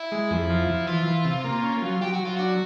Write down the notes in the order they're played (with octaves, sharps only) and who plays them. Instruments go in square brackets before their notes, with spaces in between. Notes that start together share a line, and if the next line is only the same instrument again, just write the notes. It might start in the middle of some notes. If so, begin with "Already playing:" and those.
Already playing: [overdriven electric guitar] E4
[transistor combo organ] G#3
F2
F3
F3
[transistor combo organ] E3 [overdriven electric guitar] F4
[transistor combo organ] E3
C3
A#3
C#4
F#3
[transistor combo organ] F#3 [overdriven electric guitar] G4
[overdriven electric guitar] F#4
[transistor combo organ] F#3 [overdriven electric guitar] F4
[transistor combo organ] D4 [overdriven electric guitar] F#4